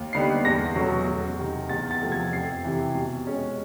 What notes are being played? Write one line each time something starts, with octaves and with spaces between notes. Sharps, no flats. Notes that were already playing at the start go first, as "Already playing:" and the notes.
Already playing: D#2
D3 G3 B3 D#4 C7
E2 A#6
B2 F#3 A3 C#4
E2
C3 D#3
E2 A6
A6
C3 F3 A3
G#6
F2 C7
C3 E3
B2
G#3 C#4